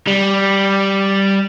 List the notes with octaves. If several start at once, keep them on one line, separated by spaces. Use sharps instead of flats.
G3